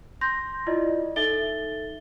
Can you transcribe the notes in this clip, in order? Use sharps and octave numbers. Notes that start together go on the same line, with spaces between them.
C6 G6 A#6
E4 F4 D5 D#5
D#4 A4 E5 A6 G7